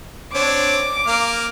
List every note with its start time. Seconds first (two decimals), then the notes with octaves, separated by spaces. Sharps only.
0.34 C4 D4 C#5 D6
1.07 A#3 F5 F6